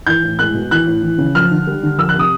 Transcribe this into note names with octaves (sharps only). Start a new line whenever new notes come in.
E3 G6
A2
G#3 F#6
B2
E3 F#6
A2
E3
C#3
F3 F6
D3
G3
D3
F3 E6
F#6
C3
D#6